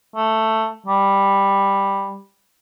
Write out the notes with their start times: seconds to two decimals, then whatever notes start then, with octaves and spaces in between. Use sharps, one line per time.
0.15 A3
0.86 G3